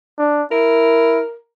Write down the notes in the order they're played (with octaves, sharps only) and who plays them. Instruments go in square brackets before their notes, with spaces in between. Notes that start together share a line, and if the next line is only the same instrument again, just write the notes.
[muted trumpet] D4
[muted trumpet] E4 [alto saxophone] A#4